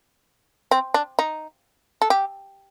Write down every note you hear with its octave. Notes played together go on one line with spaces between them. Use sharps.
C4
D4
D#4
A4
G4